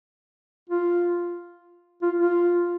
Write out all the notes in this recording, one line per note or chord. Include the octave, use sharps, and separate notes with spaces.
F4
F4
F4